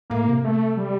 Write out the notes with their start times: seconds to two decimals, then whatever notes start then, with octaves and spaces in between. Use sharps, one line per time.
0.10 A2 A#3
0.27 C3
0.45 A3
0.77 G3